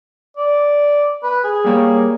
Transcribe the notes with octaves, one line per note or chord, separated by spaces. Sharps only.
D5
B4
G#4
G3 A#3 C#5